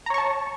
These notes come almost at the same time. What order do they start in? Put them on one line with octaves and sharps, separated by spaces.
A#5 C#5 C#6 A5